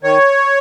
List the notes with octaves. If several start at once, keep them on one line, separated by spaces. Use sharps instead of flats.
D#3 C#5